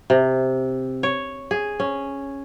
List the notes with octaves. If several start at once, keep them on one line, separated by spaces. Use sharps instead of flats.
C3
C#5
G#4
C#4